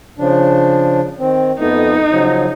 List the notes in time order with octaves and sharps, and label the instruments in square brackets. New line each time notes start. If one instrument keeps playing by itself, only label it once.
[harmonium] C#3 F3 D4
D#3 C4
[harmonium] F2 A3 B3 [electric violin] D#4
[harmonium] C#3 F3 F#3